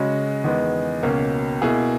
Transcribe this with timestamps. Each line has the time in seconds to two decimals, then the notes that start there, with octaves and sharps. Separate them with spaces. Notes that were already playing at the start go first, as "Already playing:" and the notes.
Already playing: C#3 G#3 C#4 F#4
0.44 E2 D#3 G#3 B3
1.03 C#2 B2 A#3 C#4
1.62 B2 A#3 E4 G#4